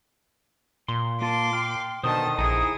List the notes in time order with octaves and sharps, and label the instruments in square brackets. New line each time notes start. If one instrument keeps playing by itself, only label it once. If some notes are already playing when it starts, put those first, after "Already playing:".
[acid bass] A#2 [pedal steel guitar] C6
[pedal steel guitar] A#3 F4 A5 [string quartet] C6 D6
[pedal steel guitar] G5 F6
[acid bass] B2 [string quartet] D3 D#3 A5 [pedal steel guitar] C5 [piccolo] D#6
[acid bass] A#1 [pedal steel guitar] D#4 E4 C5 [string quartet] G#4